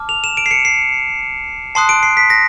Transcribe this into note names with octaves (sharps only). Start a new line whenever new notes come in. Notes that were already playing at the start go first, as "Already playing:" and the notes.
Already playing: A5 D6 F6
F7
E7
D7
C7
C#7
C7
A5 C6 D#6 F#6 C7
D7
C7
B6
A#6